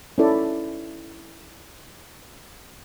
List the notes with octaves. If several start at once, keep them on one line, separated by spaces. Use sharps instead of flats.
C#4 D#4 E4 A4 D5